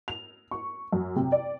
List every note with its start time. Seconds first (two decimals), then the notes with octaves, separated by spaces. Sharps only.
0.08 F7
0.51 C#6
0.93 F#2
1.16 C3
1.32 D5